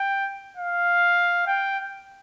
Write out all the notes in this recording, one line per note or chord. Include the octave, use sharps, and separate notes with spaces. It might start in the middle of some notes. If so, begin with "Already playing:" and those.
Already playing: G5
F5
G5